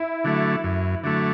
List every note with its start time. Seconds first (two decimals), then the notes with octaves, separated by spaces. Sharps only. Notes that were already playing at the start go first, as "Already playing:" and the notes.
Already playing: E4
0.24 D3 F#3 A3
0.64 F#2
1.04 D3 F#3 A3